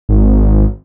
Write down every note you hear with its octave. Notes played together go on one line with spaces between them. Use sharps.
G#1